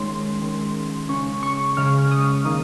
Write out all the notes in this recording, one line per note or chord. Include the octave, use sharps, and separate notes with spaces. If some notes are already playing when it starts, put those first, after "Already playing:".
Already playing: D#3 G#3 C#4 C6
D#3 G#3 C#4
C#3 G#3 C#4 C#6
C#6
C#3 G#3 C#4 F6
D#6
D#3 A#3 D#4 D#6